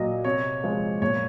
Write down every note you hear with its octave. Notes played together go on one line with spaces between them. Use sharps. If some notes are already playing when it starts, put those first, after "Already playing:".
Already playing: A#2 F#3 D#5
C3 C#5
F3 G#3
A#2 C#5